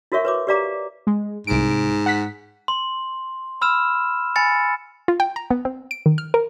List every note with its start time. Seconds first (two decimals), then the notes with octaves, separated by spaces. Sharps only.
0.12 E4 F#4 A#4 C#5 E5 C#6
0.25 B4 C#5 D6
0.47 G4 B4 D5 F5 A#5 D6
1.07 G#3
1.47 C2 G#2 D7
2.06 F#5 B6
2.68 C6
3.61 B5 E6 F6 E7
4.36 G#5 B5 A6 C#7
5.08 F4
5.20 G5
5.36 A#5
5.50 B3
5.65 C4
5.91 D7
6.06 D#3
6.18 F6
6.34 A#4